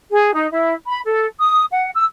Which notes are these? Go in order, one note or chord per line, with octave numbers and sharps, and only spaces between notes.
G#4
D#4
E4
B5
A4
D#6
F#5
E6